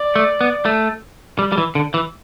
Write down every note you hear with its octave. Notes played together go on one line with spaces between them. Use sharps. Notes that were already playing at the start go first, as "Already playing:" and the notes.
Already playing: D5
A3
B3
A3
G3
G3
E3
D3
E3